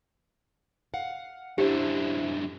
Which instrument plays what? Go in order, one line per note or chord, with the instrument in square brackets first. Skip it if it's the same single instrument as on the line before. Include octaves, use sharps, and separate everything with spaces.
[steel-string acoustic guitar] F5 F#5
[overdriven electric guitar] F#2 D3 [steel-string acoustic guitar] D4 E4 C5 [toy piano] G4